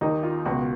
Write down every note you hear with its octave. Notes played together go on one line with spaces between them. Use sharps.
D#2 D#3 D#4
F4
C#2 B2 F#4